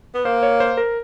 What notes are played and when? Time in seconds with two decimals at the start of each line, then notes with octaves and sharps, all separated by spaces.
0.14 B3
0.25 A#3 C5
0.43 C#5
0.60 C5
0.77 A#4